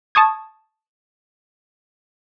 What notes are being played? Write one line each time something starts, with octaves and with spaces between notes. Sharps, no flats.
A5 C#6 D#6 G#6